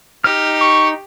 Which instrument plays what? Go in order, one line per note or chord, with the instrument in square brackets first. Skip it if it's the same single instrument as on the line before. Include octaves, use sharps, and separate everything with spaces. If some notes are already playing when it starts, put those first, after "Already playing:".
[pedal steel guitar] D#4 F6 [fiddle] G4
[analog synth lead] C#6